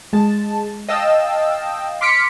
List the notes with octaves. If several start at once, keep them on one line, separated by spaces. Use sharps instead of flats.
G#3 A5
D#5 F5 G5 A5 E6
C6 D6 F6 B6 C#7 D7